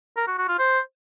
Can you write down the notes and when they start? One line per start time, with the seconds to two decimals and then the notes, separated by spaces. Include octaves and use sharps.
0.17 A#4
0.28 F#4
0.38 F#4
0.49 F4
0.59 C5